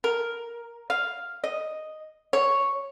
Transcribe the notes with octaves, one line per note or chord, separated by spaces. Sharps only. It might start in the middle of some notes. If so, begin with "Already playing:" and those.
A#4
F5
D#5
C#5